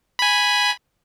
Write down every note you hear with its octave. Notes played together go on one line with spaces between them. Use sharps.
G#5 B5